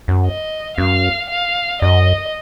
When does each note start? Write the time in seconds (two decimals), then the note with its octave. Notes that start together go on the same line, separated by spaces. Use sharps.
0.08 F#2
0.26 D#5
0.77 F#2 F5
1.29 F5
1.82 F#2 D#5